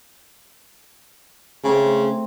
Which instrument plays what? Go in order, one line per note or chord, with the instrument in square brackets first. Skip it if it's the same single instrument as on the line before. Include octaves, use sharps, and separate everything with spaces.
[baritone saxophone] C#3 [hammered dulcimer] A3 C4